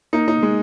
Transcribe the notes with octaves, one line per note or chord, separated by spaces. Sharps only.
A#3 D#4
A#3 D#4
G#3